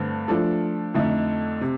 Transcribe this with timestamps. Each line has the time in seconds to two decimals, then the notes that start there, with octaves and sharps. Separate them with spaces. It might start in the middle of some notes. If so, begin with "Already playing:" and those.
Already playing: G2 D3 A3 C4
0.28 F3 A3 D4 A4
0.94 F2 D3 A3 D#4
1.61 C3